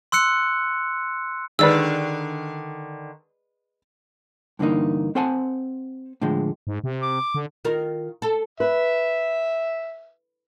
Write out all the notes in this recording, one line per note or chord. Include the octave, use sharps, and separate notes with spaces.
C6 E6 F#6 C#7
D3 D#3 G#3 B4 D5 E6
G2 D3 E3 A#3 D#4
C4 A4 C5 F#5 G#5 A5
A2 D3 F3 G#3
G#2
C3
D6
D3
D#3 F4 A#4
A4
B4 E5